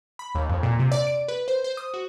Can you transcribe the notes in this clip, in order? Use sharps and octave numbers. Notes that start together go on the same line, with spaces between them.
B5
D#2
F2
A#2
C3
D5
D7
B4
C5
C5
D#6
F#4